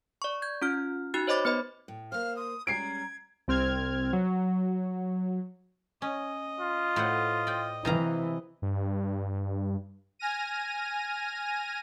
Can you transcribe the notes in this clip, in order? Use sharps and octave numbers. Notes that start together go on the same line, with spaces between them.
D5 C#6
G6 G#6
C#4 F4 F6
D#4 F#4 F#6 A6
C5 C#5 D#5 B5 D6 A6
B3 B4 D#5 B5
A2
A#3 C5 F5 F6
C6 D#6
G3 G#3 C#4 A#5 G#6 C7 D7
C2 C4 F6 G#6
F#3
C#4 D#5
F4
A2 C5 F#5
D5 G5
C3 E3 F5 A#5
G2
G#5 F6 A#6 D#7